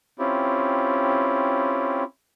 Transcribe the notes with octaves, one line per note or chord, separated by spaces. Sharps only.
C4 C#4 E4 F4 G4